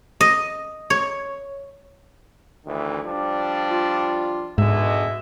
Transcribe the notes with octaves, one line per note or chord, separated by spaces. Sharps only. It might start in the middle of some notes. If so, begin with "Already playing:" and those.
D#5
C#5
D2 D#3 E3
F3 G3 D4
F4
G#2 B2 D3 G#3 E5